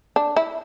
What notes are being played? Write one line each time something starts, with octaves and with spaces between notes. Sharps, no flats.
D4
E4